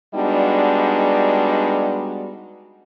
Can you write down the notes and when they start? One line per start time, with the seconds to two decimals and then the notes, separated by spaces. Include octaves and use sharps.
0.15 G3 G#3 B3 D4 D#4 F#4